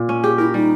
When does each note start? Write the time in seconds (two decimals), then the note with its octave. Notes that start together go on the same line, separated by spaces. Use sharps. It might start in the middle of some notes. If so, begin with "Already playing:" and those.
Already playing: A#2
0.09 C#4
0.23 G4 G#4
0.38 E4 A#4
0.54 G3 D#4